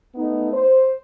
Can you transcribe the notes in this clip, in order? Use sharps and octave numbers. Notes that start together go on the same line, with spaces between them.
A3 B3 D#4
C5